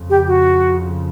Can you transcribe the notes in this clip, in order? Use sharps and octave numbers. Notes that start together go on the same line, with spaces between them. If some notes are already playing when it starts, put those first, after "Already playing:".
Already playing: F2 C#3 F3
G4
F#4